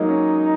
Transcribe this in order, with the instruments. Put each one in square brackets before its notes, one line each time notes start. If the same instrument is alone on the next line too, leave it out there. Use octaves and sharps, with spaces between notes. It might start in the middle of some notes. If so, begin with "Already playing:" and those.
Already playing: [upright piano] F#3 G#3 A#3 G#4 [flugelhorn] D#4
[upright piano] C#4